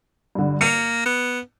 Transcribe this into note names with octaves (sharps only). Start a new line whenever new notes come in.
G2 D3
A#3 C#7 F7
B3